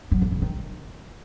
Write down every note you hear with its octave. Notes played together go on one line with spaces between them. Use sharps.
F#3
D3
C#3
D#3